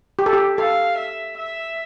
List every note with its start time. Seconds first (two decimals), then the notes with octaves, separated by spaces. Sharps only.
0.19 G4
0.26 A4
0.33 G4
0.58 A4 F5
0.97 E5
1.37 E5